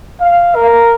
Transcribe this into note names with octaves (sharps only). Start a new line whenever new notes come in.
F5
A#4